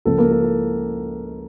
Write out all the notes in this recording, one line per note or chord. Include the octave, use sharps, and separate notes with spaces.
C#2 C#3 F3 A#3 A4
A#3 A#4
A4
A4